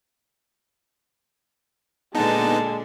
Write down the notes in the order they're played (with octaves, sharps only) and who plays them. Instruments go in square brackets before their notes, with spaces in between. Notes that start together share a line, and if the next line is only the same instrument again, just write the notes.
[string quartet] A#2 D3 D4 [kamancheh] G#3 [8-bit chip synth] B3 D#4 [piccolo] A5